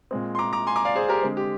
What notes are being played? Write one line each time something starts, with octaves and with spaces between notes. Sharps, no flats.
A#2 G#3 C4
C6
A#5 D6
A#5 D6
G#5 C6
A#5 D6
D5 F5
G#4 C5
G4 A#4
D3 G#3 C4
G4